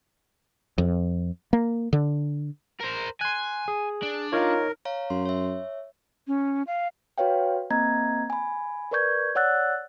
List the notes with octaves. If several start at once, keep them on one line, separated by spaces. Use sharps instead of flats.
F2
A#3
D3
A#4 C5
G#5 C6 F#6
G#4
D4
D#4 F4 A#4 C#5
C#5 F5 A#5
F#2 C6
C#5 E5
C#4
F5
F#4 B4 C#5 F5 G5
A#3 C4 D#5 A#5 G#6
G#5 B5
A#4 B4 D5 C#6 G6 G#6
C#5 D5 F#5 E6 F#6 A6